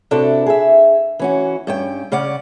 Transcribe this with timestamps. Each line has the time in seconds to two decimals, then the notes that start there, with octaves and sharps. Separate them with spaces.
0.11 C3 D4 E4 F#4 A4
0.46 G#4 E5
1.19 E3 C#4 F#4
1.67 G2 C#4 G5
2.12 C#3 C#4 D5 F#5